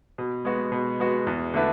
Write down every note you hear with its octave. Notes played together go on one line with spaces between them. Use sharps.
B2
G#3 B3 F#4
B2
G#3 B3 F#4
E2
D3 A3 E4 B4